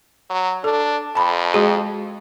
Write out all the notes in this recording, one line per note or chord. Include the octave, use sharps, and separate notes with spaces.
F#3
D4 A4
F2 A5 B5
G#3 F#4 G#4